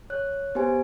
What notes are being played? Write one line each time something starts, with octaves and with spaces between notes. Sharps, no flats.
C#5 F#6
B3 G4 C5 G#5